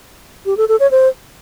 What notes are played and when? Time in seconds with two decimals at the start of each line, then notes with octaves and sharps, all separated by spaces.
0.46 G4
0.57 A4
0.69 A4
0.80 C#5
0.91 C5